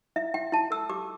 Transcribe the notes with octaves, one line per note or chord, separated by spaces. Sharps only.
E4 E5
E4 G5
E4 A5
A4 E6
G4 D6